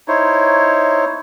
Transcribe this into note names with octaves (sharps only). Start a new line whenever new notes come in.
D#4 E4 C5 C#5